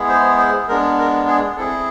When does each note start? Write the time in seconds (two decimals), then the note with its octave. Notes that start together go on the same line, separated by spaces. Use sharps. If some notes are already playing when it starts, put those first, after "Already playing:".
Already playing: G#3 B3 E4 G#4
0.09 C5
0.38 C5
0.68 G#3 B3 D4 A#4
0.99 A#4
1.28 G#4
1.57 C4 E4 G#4 A4